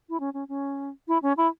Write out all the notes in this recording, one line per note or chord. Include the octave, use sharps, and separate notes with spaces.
E4
C#4
C#4
C#4
E4
C#4
E4